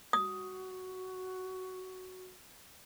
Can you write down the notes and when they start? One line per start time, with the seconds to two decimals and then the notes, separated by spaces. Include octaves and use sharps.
0.13 F#4 D#6